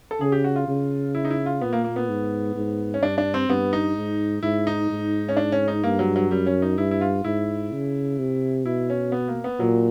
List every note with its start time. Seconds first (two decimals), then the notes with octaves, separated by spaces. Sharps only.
0.11 A4
0.21 C#3 G#4
0.32 G4
0.44 F#4
0.56 F4
0.68 C#3
1.15 E4
1.25 D#4
1.31 E4
1.46 F4
1.61 A#2 B3
1.73 A#3
1.84 A#3
1.96 B3
2.09 G#2
2.55 G#2
2.94 C#4
3.02 G2 D4
3.18 D4
3.34 C4
3.49 G2 B3
3.73 D#4
3.96 G#2
4.43 G#2 E4
4.67 D#4
4.90 G#2
5.29 C#4
5.37 D4
5.52 C#4
5.68 D#4
5.84 G2 A#3
5.99 F#3
6.16 F#3
6.30 F#2 G3
6.47 C#4
6.62 D#4
6.78 G2 E4
6.91 E4
7.01 F4
7.24 G#2 E4
7.72 C#3
8.19 C3
8.65 B2 E4
8.90 C#4
9.12 B3
9.28 A#3
9.44 B3
9.59 A#2 F#3